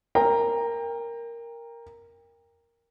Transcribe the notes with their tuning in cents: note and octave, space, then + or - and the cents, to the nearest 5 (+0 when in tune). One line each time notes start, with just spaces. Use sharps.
A#4 +0 G5 +30 A#5 +0